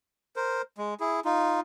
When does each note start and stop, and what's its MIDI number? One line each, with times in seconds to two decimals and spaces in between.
0.36 0.62 70
0.36 0.62 72
0.78 0.94 56
1.00 1.20 64
1.00 1.20 68
1.25 1.60 63
1.25 1.60 65